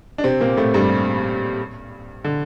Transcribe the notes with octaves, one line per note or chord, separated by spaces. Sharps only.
D4
C3 C4
A#2 A#3
A2 A3
G2 G3
D3